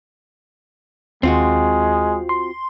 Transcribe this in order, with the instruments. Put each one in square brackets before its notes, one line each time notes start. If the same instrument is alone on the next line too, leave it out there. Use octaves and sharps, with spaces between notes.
[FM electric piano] D#2 [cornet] G#3 [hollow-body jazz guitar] C4 F4 F#4
[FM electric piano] C6